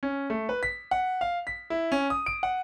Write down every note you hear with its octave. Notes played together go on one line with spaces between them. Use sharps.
C#4
A3
B4
B6
F#5
F5
B6
E4
C#4
D#6
D7
F#5